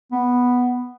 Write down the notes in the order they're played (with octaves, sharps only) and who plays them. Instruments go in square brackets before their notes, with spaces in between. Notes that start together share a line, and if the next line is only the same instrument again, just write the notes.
[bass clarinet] B3